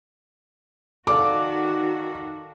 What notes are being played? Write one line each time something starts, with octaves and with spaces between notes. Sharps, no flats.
D#3 F#4 A4 D5 F5 D6